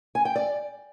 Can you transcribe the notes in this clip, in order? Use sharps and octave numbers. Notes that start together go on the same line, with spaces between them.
G#5
G5
D5